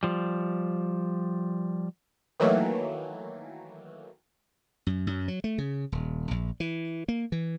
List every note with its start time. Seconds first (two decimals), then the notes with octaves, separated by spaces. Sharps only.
0.03 F3 G3
2.40 D#3 E3 F#3 A3 A#3
4.87 F#2
5.07 F#2
5.28 F#3
5.44 A3
5.58 C#3
5.92 D#1
6.31 A#1
6.60 E3
7.08 A#3
7.32 E3